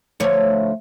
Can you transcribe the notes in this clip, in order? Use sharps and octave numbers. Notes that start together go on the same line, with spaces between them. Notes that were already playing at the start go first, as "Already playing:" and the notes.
D2 F3 C#5